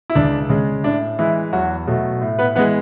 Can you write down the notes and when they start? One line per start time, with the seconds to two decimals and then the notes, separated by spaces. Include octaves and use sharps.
0.10 E4
0.15 C#2 D4
0.49 C#3 G#3
0.84 A2 D4
1.19 E3 G#3 E4
1.53 E2 F#3 F#4
1.87 B2 F#3 A3
2.21 A2
2.39 B3 B4
2.56 E3 G#3 B3 B4